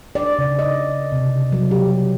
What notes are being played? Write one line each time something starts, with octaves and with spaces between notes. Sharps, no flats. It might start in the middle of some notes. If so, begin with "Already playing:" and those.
D5
C#3
D#5
C3
F#3
G4